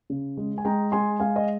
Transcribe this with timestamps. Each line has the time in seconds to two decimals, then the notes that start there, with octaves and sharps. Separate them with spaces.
0.10 C#3
0.37 G#3
0.58 G#5
0.65 G#3 G5 A#5
0.92 G#3 G#5 C6
1.19 G#3 F5 G#5
1.36 D#5